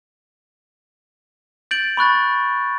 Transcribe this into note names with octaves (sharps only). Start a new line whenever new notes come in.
G6 A6 D7 F#7
B5 C#6 F#6 A6